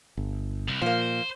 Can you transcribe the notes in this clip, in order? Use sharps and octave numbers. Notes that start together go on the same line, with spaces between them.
G1
C2
A#2 F3 A#3 C5